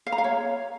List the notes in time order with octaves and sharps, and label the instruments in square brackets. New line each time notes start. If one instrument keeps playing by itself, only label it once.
[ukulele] F5
A#5
F5
C#5